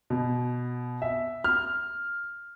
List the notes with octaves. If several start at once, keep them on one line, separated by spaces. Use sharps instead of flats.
B2
E5
F6